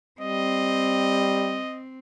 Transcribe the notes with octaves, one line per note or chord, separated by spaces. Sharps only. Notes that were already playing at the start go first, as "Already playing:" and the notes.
G3 C4 D#5